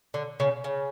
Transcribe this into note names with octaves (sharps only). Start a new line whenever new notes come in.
D3
C#3
C#3